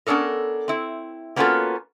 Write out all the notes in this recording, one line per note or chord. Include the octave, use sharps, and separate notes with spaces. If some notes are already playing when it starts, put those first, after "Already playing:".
B3 C#4 D4 A4 A#4
C4 E4
A#3 B3 C#4 F4 F#4 A4